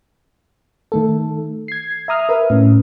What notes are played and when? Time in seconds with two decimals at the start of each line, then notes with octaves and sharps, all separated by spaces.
0.92 D#3 A3 A4
1.68 G#6 C7
2.08 E5 A#5 D#6 F6
2.29 A#4 B4 E5
2.50 A2 C#4